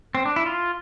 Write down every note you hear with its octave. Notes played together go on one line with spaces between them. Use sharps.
C4
D4
E4
F4